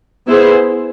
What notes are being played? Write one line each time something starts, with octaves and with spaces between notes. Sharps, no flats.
B3 E4 G#4 C5